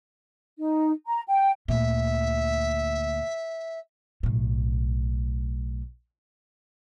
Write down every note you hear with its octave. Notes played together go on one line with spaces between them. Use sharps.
D#4
A#5
G5
D2 A#2 E5
B1 A2